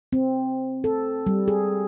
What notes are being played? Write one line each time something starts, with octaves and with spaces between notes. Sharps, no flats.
C4
A4
G3
G#4